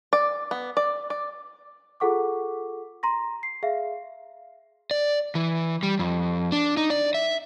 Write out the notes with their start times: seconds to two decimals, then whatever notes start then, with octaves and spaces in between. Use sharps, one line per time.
0.13 D5
0.51 B3
0.77 D5
1.10 D5
2.00 F4 G#4 A4 F#5 C#6 D6
3.03 A#5 C6 A#6
3.43 C7
3.63 G#4 E5 F5
4.91 D5
5.35 E3
5.83 G3
5.99 F2
6.52 D4
6.77 D#4
6.90 D5
7.14 E5